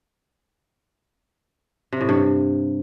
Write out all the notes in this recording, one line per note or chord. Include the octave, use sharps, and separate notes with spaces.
C3
A2
G2